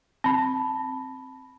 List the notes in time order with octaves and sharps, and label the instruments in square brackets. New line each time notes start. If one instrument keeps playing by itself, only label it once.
[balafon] C4 [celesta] A5 B5